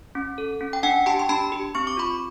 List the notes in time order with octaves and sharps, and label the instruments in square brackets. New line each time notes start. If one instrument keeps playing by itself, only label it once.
[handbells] C#4
A4
C#4
G5
D4 F#5 G#5
G4 G5 A5
C6
D4 A5 B5
G4
C4 C#6
D6
F4 B5 C#6